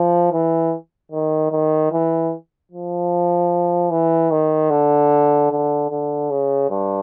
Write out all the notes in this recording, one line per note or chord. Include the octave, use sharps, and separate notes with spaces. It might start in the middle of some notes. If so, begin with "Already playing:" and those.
Already playing: F3
E3
D#3
D#3
E3
F3
E3
D#3
D3
D3
D3
C#3
G2